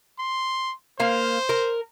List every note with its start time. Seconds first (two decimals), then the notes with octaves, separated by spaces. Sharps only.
0.19 C6
1.00 A#3 C5 F5
1.49 A#4